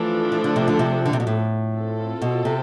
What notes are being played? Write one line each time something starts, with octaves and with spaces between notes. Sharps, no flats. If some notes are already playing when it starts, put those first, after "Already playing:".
Already playing: E3 F3 A3 D4 A4
E3
D3
C3
D3
C3
D3
C3
B2
A2
C4 F4 A4
B2
C3